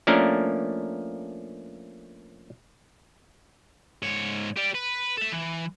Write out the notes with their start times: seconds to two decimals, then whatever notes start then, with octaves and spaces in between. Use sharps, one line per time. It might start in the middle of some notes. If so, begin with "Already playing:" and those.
0.07 F3 A3 A#3 C#4 D4 A#4
4.02 G#2 C#5
4.57 G4 D5
4.75 B4
5.17 A4 E5
5.32 E3